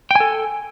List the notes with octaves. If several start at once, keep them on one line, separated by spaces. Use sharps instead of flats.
A4 G5 G#5